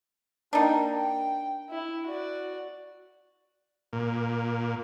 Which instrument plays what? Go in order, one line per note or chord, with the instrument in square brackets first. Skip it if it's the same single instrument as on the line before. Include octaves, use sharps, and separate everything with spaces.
[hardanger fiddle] A#3 G5 [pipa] D4 D#4
[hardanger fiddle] G5
E4
F#4 D5
[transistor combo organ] A#2